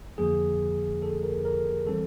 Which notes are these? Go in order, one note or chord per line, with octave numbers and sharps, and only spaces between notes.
F2 D3 F3 A#3 G#4
A4
A#4
A#4
E3 G3 C4 A4